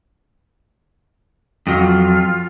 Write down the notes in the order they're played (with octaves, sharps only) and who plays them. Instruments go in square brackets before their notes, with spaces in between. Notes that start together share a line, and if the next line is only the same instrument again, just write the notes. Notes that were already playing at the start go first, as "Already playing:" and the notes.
[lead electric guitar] F2 F#3 [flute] F4